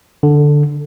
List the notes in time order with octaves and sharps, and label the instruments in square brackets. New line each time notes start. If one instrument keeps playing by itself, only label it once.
[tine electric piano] D3